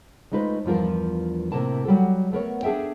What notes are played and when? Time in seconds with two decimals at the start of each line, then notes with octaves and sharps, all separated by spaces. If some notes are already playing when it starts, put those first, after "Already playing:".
0.32 G#3 A3 D#4 F4 B4 C5
0.65 E2 G2 F3 F4 A#4
1.52 A2 C3 F#3 A#3 A#4 A5
1.85 F#3 G3 F#4 A4
2.32 A3 B3 A#4 C#5
2.63 D4 G#4 A4 E5 G5